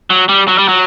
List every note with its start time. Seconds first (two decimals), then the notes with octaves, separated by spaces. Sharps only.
0.10 F#3
0.29 G3
0.48 F#3
0.58 G3
0.68 F#3